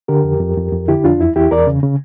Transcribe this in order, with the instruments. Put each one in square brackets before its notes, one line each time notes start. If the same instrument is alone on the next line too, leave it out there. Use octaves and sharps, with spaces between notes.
[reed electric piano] D3 G4 A#4
F2
F2
F2
F2
D3 E4 G4
F2 D4 F4
E2 E4
E2 E4 G4
E2 A#4 D5
C#3
C#3